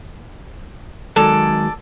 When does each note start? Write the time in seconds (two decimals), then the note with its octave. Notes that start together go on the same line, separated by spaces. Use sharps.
1.16 D#3 F#3 G#3 A4 D5